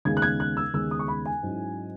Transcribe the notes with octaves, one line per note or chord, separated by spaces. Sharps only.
D#2 C#3 G#3 B3 D#4 G#6
F#6
G#6
F#6
E6
D#2 C#3 G#3 B3 D#4 E6
D#6
C#6
B5
G#5
G#2 F#3 C#4 E4